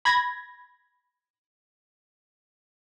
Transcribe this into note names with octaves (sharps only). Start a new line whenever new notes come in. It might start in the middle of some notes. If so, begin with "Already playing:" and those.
B5 G#6 A#6